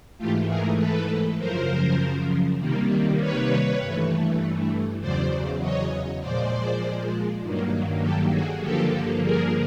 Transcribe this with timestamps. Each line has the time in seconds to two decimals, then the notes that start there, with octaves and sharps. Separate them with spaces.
0.18 G#2 E3 A3 F4 G4
0.48 G#4 A#4
0.79 A4 B4
1.39 F#2 C#3 F3 A#4 C5
2.59 C3 D#3 G3 A#3
3.20 B4 C#5
3.80 G2 E3 A3
5.00 E2 C#3 F#3 C5 D5
5.61 C#5 D#5
6.21 A#2 F3 G#3 C5 D5
7.43 G2 D#3 F#3 A#3
8.02 G4 A4
8.33 F#4 G#4
8.62 G2 D3 F3 A#3 G4 A4
9.23 G#4 A#4